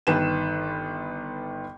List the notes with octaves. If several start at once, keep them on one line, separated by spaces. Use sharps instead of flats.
G1 D#3 B4 E7